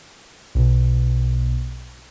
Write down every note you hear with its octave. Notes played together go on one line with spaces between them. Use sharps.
B1 B2